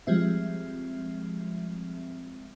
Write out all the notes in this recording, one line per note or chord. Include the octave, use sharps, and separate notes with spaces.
F3 G3 G#3 C4 E5